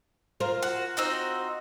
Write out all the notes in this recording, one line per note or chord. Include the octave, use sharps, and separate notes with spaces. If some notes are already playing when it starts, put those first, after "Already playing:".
F4 A#4 C5
F#4
C4 D#4 F#4